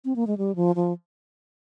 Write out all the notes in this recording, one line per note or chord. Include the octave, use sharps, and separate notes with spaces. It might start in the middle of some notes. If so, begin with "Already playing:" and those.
C4
A#3
G#3
G3
F3
F3